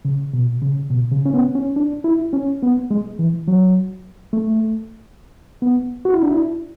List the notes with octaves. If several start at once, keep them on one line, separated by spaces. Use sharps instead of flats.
C#3
B2
C#3
B2
C#3
C#4
B3
C#4
D4
E4
C#4
B3
G#3
E3
F#3
A3
B3
F#4
E4
D4
E4